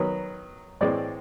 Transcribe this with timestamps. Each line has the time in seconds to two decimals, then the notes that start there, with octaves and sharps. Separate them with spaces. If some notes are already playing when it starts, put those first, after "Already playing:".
Already playing: D#3 F#3 B3
0.81 A2 E3 G#3 C4 D5